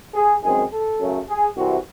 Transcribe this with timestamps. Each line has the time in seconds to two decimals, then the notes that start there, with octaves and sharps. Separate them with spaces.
0.14 G#4
0.43 F#2 D#3 G#3 C4 G#4
0.72 A4
1.00 F#2 C#3 F#3 A3
1.29 G#4
1.57 C2 C3 E3 C4 F#4